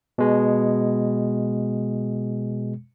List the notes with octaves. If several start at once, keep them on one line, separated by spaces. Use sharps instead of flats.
B2 G#3